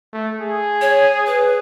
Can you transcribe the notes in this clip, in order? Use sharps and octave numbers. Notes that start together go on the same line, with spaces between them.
A3
G#4
C#5
B4